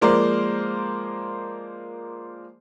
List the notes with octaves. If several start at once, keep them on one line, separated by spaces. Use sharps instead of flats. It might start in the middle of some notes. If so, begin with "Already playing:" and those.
F3 G#3 A#3 A#4 C5 D5